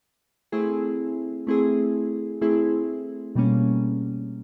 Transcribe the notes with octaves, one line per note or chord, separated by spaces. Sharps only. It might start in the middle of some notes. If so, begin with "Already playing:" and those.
A3 C4 E4 G#4
A3 C4 E4 G#4
A3 C4 E4 G#4
B2 G3 A#3 C#4